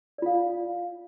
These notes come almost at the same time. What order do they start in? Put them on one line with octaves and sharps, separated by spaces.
D5 F4 F5